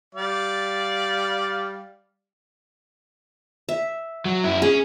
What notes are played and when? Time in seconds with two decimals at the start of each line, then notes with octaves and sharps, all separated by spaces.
0.15 G3 D5 F5
3.69 E5
4.25 F#3
4.44 F#2 E4
4.62 C#4 G#4